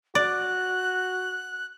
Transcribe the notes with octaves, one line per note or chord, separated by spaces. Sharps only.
F#4 D5 F#6